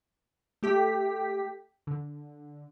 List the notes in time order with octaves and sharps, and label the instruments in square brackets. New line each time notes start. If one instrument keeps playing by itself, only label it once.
[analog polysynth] A3 G4 B6
D3